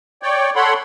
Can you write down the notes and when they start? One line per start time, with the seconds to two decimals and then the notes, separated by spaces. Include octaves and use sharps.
0.23 C#5 D5 G5
0.56 A4 C#5 F#5 B5 C6